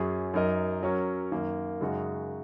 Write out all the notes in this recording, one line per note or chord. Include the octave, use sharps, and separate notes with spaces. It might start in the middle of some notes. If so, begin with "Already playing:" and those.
Already playing: F#2 F#3 C#4 G#4
F#2 F#3 D#4 A#4 D#5
F#3 C#4 A#4
F#2 D#3 A#3
F#2 C#3 G#3 D#4 F#4